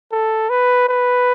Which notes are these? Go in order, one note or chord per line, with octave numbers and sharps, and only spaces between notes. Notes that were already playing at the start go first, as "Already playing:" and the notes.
A4
B4
B4